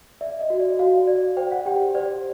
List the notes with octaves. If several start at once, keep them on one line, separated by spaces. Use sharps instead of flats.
D5 E5
D#5
F#4
D5
F#4 F5
D5
C5 G5
F#5
G4 G5
C5 D5